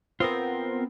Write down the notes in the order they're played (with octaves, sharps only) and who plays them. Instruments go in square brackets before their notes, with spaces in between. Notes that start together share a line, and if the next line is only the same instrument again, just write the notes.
[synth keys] B3 C4 [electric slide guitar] F4 A#4